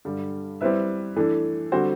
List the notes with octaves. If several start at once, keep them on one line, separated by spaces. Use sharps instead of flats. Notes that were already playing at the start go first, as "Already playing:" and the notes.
G2 D3 G3
G3 C4 E4 B4 E5
E3 A3 D4 A4
D3 G3 C4 F#4 C5